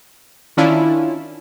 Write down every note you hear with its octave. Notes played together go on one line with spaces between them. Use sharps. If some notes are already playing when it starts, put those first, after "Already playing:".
D#3 C#4 D4 E4 F4